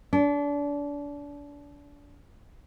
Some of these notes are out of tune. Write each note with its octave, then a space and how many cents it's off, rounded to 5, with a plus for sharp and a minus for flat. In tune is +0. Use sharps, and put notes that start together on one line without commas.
D4 -30